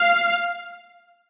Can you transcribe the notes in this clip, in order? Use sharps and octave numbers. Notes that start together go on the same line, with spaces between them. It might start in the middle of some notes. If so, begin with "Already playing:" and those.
Already playing: F5